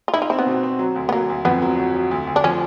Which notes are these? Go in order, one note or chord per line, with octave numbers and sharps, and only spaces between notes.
F4
D#4 E4
F4
C4 E4
B3
B2
C4
F#3
D2
B3
F#3 A#3
D2
F2 B3
F#3
F#3
F#3
D2
D2
D4
F3 C#4